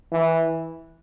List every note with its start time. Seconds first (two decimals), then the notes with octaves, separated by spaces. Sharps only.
0.12 E3